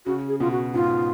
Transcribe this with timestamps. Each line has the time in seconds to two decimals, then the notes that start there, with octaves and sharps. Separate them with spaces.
0.06 C#3 F#4
0.28 G#4
0.40 B2 F4
0.51 F#4
0.74 G#2 F4